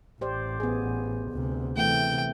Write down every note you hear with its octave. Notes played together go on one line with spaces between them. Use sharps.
A1 G4 C5 D5
B3 G#4
D2 C3
C3 E3 A3 G5